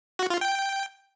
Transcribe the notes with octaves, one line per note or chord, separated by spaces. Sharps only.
F#4
F4
G5